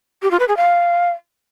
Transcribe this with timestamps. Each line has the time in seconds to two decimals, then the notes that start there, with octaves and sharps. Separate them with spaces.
0.22 G4
0.31 F4
0.40 B4
0.48 G#4
0.57 F5